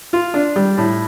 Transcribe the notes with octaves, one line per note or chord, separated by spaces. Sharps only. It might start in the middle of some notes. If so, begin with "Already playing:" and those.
F4
D4
G3
A2